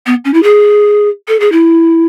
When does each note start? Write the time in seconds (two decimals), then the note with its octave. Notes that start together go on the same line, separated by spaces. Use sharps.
0.07 B3
0.25 C#4
0.34 E4
0.43 G#4
1.28 A4
1.40 G#4
1.52 E4